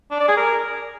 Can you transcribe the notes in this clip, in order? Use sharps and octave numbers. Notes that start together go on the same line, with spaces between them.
D4
D5
G#4
A#4